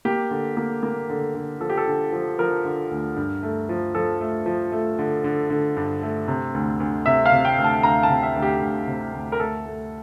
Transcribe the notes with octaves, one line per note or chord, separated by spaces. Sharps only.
A#3 G4
D3
A#3
A#3
D3
D3
F3 A4
G4
A4
D3
F3
F3 A#4
D3
D2
G2
A3
F3
F3 A4
A3
F3
A3
D3
D3
D3
G2
A3
C3
D2
D2
C3 E5
F5
C3
G5
D2
A5
D2 A#5
A5
C3
E5
D2
G4
D2
C3
D2
A#4
A3 A4
A3